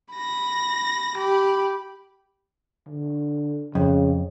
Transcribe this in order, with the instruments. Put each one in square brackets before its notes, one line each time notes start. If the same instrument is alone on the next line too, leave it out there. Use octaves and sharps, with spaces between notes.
[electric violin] B5 A#6
G4 B5
[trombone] D3
[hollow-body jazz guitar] F2 [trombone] C#3